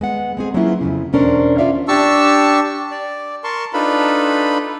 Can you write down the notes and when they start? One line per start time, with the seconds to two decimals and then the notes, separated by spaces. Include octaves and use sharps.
0.01 G#3 B3 F#5
0.37 G#3 C4 G#4
0.54 F#3 A#3 B3 C#4 E4 F4
0.81 F2 A#2 C#3
1.13 E2 B2 C#4 D4 A#4 C5
1.58 F4 C#5 D5 E5 F5
1.88 D4 G4 A5 C#6 E6
2.91 D5
3.44 A#4 A5 C6 C#6
3.73 D4 D#4 F4 A4 B4 B5